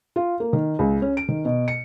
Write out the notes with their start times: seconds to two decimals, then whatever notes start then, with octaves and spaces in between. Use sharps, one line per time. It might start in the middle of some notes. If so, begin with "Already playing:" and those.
0.16 F4
0.40 A#3
0.53 D#3
0.79 C#2
1.02 C#4
1.17 D7
1.28 D#3
1.45 B2
1.68 C#7